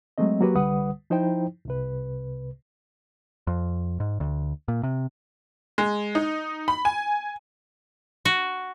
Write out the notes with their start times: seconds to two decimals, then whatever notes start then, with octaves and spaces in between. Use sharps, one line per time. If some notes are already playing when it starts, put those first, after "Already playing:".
0.18 F#3 G#3 A3 C4 D#5
0.41 F#3 A#3 F#4 G4 B4
0.55 C2 D3 G3 B4 F#5 D#6
1.10 F3 D#4 E4 C5 G5
1.66 C2 C3 B4
3.47 F2
4.00 G#2
4.20 D2
4.68 A#2
4.83 C3
5.78 G#3
6.15 D#4
6.68 B5
6.85 G#5
8.25 F#4